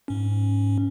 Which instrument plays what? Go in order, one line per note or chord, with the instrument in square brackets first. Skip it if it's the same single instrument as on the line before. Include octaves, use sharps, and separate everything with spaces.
[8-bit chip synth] G#2 C#4